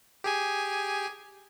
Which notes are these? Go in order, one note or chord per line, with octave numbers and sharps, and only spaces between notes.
G4 G#4 G#5